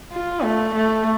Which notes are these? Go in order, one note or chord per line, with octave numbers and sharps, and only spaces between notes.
F4
A3
A3